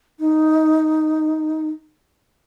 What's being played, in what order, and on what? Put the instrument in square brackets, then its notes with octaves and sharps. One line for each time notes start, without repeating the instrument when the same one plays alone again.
[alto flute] D#4